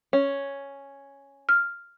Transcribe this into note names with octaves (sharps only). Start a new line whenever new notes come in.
C#4
F6